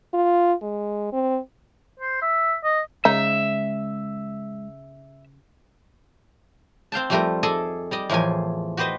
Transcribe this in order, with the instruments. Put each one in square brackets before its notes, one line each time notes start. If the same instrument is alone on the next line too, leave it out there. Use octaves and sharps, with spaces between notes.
[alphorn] F4
G#3
C4
[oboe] C5
E5
D#5
[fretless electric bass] C#3 [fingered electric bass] G#3 [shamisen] D#4 [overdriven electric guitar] E5
[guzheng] C4 F5 G5 A5
F2 G3 A3 F4 G4 A#4
G#4 A4 D5 D#5 G#5
G3 D5 D#5
E2 A2 F3 A#4 G#5
F#4 G4 B4 C5 D#5